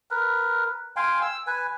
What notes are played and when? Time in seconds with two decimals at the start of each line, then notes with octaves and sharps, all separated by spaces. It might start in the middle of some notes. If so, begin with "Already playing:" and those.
0.11 A#4 B4
0.96 F5 G5 G#5 C6
1.22 E6
1.47 B4 G#5